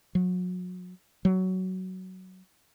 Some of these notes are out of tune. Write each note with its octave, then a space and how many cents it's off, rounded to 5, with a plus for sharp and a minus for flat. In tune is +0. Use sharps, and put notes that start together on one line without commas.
F#3 -35
F#3 +10